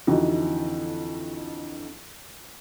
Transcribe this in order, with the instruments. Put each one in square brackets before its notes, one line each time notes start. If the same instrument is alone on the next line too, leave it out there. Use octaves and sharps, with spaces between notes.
[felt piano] F2 D3 E3 D#4 F#4